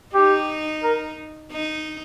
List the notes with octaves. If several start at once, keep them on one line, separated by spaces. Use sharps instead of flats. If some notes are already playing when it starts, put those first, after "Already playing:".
D#4 G4
A#4
D#4